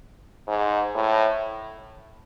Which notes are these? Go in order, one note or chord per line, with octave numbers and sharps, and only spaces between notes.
G#2
A2